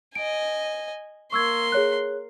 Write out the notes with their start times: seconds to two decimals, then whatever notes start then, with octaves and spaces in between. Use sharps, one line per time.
0.15 D#5 G#5 D7
1.32 A#3 C6 C#6 E6 G#6
1.72 G#4 C#5 F#6